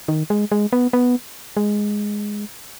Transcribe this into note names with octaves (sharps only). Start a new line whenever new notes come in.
D#3
G#3
G#3
B3
B3
G#3